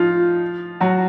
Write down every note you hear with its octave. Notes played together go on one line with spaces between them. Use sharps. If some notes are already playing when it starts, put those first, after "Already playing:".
Already playing: F3 D#4 F4
F#3 F#4